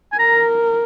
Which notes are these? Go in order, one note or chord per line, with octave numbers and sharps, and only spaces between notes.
G#5
A#4 A#5